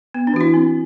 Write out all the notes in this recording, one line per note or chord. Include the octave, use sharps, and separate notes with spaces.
B3
D4
E3 F#4
E4
C4